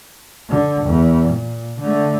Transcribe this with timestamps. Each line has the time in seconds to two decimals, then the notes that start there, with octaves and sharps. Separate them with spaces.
0.49 D3
0.86 E2
1.29 A#2
1.81 D3 A3